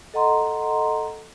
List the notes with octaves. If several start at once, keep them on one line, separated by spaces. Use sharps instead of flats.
A4 D#5 F#5 A#5 C6